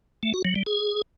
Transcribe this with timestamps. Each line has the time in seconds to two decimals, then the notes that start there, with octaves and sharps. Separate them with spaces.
0.23 A3
0.34 F#4
0.45 F#3
0.55 G3
0.66 G#4